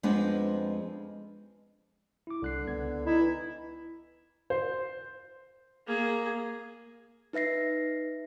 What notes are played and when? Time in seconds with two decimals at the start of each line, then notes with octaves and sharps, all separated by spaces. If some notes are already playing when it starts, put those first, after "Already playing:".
0.03 F2 G#3 B3 C4 D4 B4
2.27 E4 D6
2.42 C2 D3 F#6 C7
2.67 C#2 B3 G#6
3.06 D#4 E4
3.20 E3
4.50 C5
5.87 A#3 G#4
7.33 D#4 B4 E5 A#6 C7